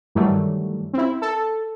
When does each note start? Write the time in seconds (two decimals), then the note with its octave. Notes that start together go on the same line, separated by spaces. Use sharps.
0.15 G2 D#3 E3 F#3 G3 A3
0.93 C4 E4
1.22 A4